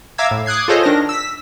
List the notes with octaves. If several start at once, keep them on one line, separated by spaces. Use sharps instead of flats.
E5 F5 A#5 D6 E6 G#6
A2
D6 D#6 F#6 G#6 C7
F4 G#4 A4 C5 C#5 D#5
D#3 D4 A#4 A#6
E6 B6